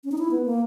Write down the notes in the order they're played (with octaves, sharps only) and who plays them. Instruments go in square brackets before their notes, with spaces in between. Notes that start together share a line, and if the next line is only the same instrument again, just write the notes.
[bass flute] C#4
D#4
E4
B3
A#3